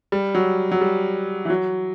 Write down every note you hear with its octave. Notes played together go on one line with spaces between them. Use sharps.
G3
F#3
F#3
G3
E3
F#3